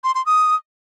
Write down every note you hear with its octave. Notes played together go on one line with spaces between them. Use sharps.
C6
C6
D#6